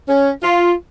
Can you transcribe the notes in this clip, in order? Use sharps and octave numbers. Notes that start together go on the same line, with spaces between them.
C#4
F4